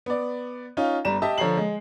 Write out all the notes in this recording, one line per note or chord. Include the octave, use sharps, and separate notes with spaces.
B3 D5
C#4 D#4 F4
G1 G3 D4 A#5 E7
G4 D#5 E5 A5
D3 F3 C#5 A#5 C7 F#7
G#3